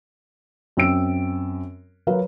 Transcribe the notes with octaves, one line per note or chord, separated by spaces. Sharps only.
F#2 C4 E6 D7
F#3 A#4 B4 F5